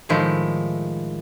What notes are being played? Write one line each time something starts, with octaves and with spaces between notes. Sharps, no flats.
A2 D#3 F3 G#3 E4